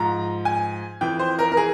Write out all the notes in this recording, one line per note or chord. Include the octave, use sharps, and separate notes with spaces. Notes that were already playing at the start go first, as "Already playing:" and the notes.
Already playing: G#2 F3 A#5
G#5
F2 E3 G5
C5
A#4
A#4
G#4